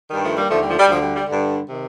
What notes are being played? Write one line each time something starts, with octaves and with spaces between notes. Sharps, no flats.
G2 D#3 G3
F3 A3
G3 A#3
D#2 D3 F3 A3
G3
F3 A3
G3
D2 D3 F3
G3
G3
G2 D3
C3 D#3